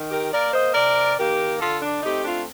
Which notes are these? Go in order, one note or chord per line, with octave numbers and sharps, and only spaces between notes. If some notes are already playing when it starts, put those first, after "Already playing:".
Already playing: D#3
G4 A#4
A#3 A#4 D5
C5 D#5
C3 A#4 D5
D#3 A#3 G4 A#4
D3 F4 A4
D4
A3 C4 D#4 G4
D4 F4